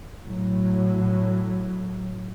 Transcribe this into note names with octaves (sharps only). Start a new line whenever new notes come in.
A2 F#3